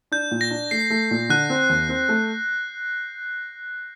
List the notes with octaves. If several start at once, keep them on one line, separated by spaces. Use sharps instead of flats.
D4 G6
A#2
A#6
D4
A3 C7
A3
A#2
D3 F#6
C4
D#2
C4
A3